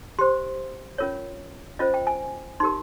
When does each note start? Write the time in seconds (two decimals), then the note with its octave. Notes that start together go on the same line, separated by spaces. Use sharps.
0.19 G4 C5 C6
0.98 C#4 F4 A#4 C#5
1.79 C#4 F4 C5 D#5
1.94 G5
2.07 G#5
2.60 D#4 G4 A#4 C6